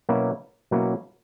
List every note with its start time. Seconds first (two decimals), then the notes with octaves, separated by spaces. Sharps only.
0.09 B2 F#3 A#3 C#4 E4
0.71 B2 F#3 A#3 C#4 E4